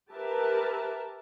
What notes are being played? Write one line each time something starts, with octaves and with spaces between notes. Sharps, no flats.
G4 A#4 B4 E5 A5